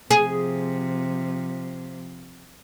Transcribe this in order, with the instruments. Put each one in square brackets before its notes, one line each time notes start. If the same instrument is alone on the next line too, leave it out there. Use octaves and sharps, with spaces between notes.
[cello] C3 F3 [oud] G#4